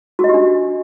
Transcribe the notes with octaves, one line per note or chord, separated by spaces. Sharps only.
F#4
D#5
G4
D4